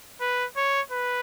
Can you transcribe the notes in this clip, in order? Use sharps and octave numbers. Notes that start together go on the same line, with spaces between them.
B4
C#5
B4